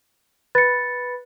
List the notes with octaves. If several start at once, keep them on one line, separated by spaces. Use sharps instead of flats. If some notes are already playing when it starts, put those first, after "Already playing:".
B4 A6 C#7